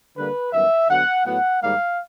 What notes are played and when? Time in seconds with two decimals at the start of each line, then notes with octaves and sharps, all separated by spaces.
0.16 D3 G3 A#3 B4
0.52 F#2 D#3 G3 B3 E5
0.88 D3 F#3 B3 F#5
1.25 A2 F#3 B3 F#5
1.62 G#2 D#3 G3 A#3 F5